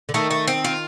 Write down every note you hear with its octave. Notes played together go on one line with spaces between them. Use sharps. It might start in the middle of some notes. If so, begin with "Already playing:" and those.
D3
D#3 A3
A3
C4
F4